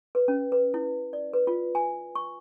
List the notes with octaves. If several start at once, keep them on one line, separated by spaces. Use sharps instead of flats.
B4
C#4
B4
E4
D5
B4
F4
G#5
C#6